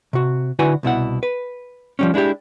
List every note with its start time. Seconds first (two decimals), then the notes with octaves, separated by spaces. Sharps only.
0.13 C3 F#4
0.59 D3 E4 F#4 B4 F#5 G#5
0.83 C2 B2 E4 F#5
1.23 B4
1.99 F3 G3 C#4
2.14 G#3 D4 E4 F#4 G4